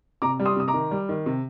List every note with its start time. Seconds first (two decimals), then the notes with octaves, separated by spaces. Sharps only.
0.22 C3 A#5 D6
0.39 G3
0.46 C6 D#6
0.56 C3 D#6
0.68 A#5 D6
0.74 D#3
0.91 G3
1.09 D#3
1.26 C3